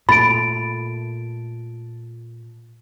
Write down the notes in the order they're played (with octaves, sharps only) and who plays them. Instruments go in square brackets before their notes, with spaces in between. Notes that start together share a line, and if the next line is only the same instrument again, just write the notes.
[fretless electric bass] A#2 A3 [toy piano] B5 [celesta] A6 D7